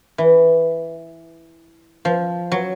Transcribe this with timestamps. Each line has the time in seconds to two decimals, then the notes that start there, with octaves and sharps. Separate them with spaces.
0.18 E3
2.05 F3
2.52 F#3